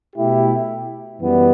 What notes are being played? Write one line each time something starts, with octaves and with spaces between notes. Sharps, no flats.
B2 A3 E4 G4
F#2 E3 G3 B3